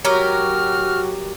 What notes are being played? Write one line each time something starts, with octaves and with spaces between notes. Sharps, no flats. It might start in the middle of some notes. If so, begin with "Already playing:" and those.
F#3 F#4 G4 A#4 C#5 F6